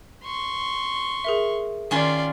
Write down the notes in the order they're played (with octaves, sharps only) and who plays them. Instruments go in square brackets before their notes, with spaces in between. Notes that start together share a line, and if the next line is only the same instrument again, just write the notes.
[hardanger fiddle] C6 C#6
[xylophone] G#4 A#4 E5
[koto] D#3 C#4 F4 [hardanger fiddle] D5 C6